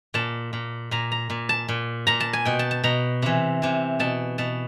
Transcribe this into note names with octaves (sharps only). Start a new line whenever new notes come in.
A#2 A5
A#2
A#2 A#5
A#5
A#2
A5
A#2
A#2 A#5
A5
G#5
B2 G5
A5
A5
B2 A#5
C3 E3
C3 E3
B2 A5
B2 A5